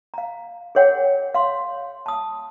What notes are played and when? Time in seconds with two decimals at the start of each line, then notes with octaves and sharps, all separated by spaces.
0.14 F5 A#5
0.75 G#4 A#4 C#5 F#5 G5
1.34 F5 C6
2.06 A5 D#6